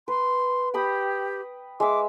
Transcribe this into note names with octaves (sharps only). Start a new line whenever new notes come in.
B4 C6
G4 G5 B5 D#6
G#3 E5 D6